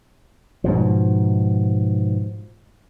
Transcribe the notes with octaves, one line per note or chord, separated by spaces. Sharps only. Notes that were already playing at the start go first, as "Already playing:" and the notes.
G#2 B2 F3